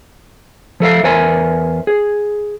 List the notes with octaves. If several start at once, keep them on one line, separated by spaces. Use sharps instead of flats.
F3 A4 E5 F5
E2 A#4 C5 E5 G#5
G#4